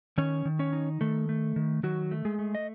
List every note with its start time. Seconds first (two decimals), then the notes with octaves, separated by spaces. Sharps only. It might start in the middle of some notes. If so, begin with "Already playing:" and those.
0.18 D#3 C#4 C#5
0.45 D#3
0.59 C#4 C#5
0.73 D#4
1.01 D#3 A3 A4
1.29 A3
1.56 D#3
1.83 D#3 F#3 F#4
2.11 A3
2.25 G#3 G#4
2.39 A3
2.55 D#5